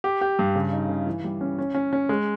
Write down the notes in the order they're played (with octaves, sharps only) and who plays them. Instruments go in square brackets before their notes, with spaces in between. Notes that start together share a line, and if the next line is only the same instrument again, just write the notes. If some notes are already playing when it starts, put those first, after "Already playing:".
[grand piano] G4
G4
G2
C#3
D#4
C#3
E3
G3
C#4
C#4
C#4
C#4
G#3